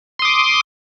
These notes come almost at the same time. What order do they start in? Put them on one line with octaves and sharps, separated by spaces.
C6 D#6 D6